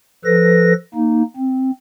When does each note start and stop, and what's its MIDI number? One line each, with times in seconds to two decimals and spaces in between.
0.25 0.73 53
0.25 0.73 69
0.25 0.73 71
0.25 0.73 94
0.94 1.22 58
0.94 1.22 63
1.36 1.71 60